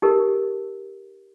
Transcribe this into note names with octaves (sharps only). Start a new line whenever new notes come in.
D#4 G4 A4 A#4